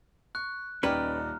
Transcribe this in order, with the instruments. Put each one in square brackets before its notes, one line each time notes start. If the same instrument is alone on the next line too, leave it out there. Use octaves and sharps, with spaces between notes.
[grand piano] C#6 [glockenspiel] F#6
[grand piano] D#1 D#4 D5 [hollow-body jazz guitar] C#4 G4 B4 [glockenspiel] A#5 F6